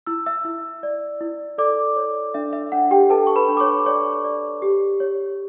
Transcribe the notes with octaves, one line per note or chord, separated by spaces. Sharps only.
E4 E6
E5 E6
E4
D5
E4
A4 D5 D6
C#5
D4 E5
E5
D4 F#5
G4 G5
A4 B4 A5
C#6
B4 B5
D4
D6
C#5 C#6
C#5 D5 C#6
D5
G4
C#5